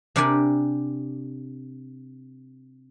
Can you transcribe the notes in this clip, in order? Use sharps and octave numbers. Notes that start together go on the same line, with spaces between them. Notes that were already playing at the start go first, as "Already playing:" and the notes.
C3 D4 G4 A#4 D5 G#5